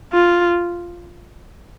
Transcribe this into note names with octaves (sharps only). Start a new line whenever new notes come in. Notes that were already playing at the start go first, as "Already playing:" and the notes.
F4